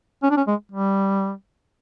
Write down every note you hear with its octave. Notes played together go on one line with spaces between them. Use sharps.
C#4
D4
C#4
G#3
G3